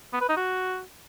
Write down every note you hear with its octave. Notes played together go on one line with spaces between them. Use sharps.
B3
B4
D#4
F#4